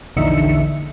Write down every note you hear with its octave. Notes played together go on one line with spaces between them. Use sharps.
A#1 E2 D3 D#4 E5 C#7